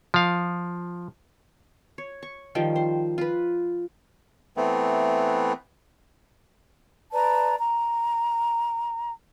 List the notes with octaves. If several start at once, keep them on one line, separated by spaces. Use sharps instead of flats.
F3 F5
C#5
C#6
D#3 F3 G3 G5
C5
F4 B4
E3 A3 B3 C4
B4 D5 A5 A#5
A#5